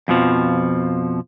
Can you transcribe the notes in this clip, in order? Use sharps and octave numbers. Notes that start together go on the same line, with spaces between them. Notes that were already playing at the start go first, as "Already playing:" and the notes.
F2 B2 F3